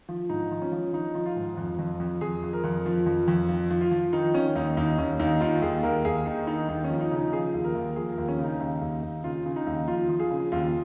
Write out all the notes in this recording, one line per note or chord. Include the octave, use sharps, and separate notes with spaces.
F3
G#2 D#4
F3
C#4
F3
F3 D#4
F3
F4
G#2
F2
F2
F2
F2 G#4
F2
A#4
F2
F3
F2
F2
F3
F3
F4
F3
D#3 D#4
D#3 C#4
D#2 D#4
D#2 D#4
D#2 C#4
D#2 D#4
D#3 F4
D#2 G#4
D#2 A#4
D#2 G#4
D#3 D#4
D#3 D#4
D#2 D#4
C#4
F3
D#4
C#3
D#4
F3 G#4
D#2
A#4
D#2
F3 G#4
A#4
D#2
C#4
C#3 D#4
D#2
D#2
D#2
C#3 F4
C#3
D#4
D#2
F3 F4
F3
G#4
C#3
D#2 F4